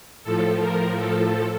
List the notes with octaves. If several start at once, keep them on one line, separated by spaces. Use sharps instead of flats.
A2 F3 A4
A#4
A4